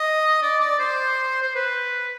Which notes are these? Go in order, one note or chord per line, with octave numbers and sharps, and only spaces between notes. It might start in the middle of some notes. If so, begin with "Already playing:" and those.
Already playing: D#5
D5
D5
C5
C5
B4